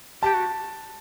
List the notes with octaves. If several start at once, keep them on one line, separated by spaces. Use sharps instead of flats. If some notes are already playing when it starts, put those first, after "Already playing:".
G4 A5
F#4